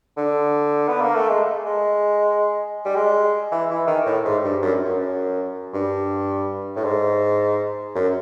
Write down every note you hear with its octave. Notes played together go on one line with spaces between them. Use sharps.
D3
B3
A#3
A3
G#3
G#3
G3
G#3
E3
E3
D#3
A2
G#2
G2
F#2
F#2
G2
A2
G#2
F#2